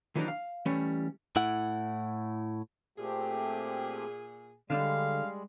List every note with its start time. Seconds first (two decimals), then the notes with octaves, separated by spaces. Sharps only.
0.16 D#3 E3 F#3 G3 D4 D#4
0.28 F5
0.66 E3 G3 A3 C#4
1.36 A2 E4 F#5
2.98 A#2 A3 C4 G4 G#4
4.70 D3 G3 G#3 D4 F5